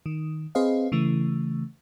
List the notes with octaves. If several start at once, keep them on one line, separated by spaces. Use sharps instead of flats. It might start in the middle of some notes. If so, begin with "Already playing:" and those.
D#3
C4 G#4 B4 C5 D#5 F5
C#3 E3 A3